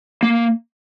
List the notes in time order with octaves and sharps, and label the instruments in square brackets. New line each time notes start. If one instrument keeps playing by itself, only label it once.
[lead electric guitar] A#3